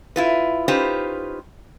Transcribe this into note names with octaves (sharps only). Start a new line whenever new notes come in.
E4 F4 B4
C#4 D#4 F4 G4 B4 C5